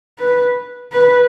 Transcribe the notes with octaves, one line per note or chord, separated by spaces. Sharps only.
B4
B4